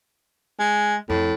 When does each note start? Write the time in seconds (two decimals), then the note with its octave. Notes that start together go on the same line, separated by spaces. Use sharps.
0.60 G#3
1.09 F2 A2